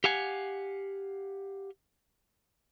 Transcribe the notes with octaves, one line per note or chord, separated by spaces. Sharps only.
G4 F5 F#5 G#5